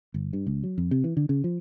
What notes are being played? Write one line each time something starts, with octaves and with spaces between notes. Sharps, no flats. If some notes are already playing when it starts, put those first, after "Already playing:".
G1
G2
C#2
F#3
F2
C3
E3
D3
C#3
F3